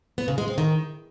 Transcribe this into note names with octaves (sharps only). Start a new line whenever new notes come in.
B3
C#3
G#3
C4
D#3